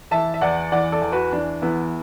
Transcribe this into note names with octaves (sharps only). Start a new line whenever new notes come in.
E3 E5 A5
E5
E2 D5 F#5
E3 D5 F#5
A4 D5
E2
F#4 B4
E3 D4
E2 B3 E4